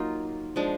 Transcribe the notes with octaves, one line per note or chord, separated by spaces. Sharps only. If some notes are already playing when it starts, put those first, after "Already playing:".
Already playing: F#3 A#3 D#4 F4
F3 G#3 D4